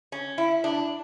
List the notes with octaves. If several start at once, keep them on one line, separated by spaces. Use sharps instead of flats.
C#4
E4
D4